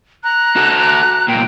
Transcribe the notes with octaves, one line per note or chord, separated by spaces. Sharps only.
A#5 F#6
F#4 A4
C2 A#2 G5